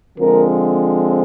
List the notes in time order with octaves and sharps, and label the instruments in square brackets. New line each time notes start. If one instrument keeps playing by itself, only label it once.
[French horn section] D3 F3 G#3 C4 A#4